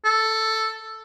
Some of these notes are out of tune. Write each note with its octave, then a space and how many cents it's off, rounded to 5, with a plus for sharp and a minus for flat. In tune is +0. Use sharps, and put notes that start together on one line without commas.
A4 +5